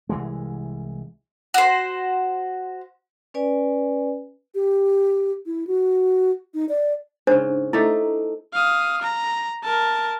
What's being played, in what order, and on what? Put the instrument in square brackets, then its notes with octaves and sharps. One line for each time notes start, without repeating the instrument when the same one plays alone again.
[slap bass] C2 E3 G#3
[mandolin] F#4 C5
[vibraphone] C#4 B4 D5 G#5
[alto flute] G4
E4
F#4
D#4
D5
[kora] G#2 C#3 [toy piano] D4 C5
[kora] A3 D#4 D5 [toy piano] E4
[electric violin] F5 D#6
A#5
A#4 A5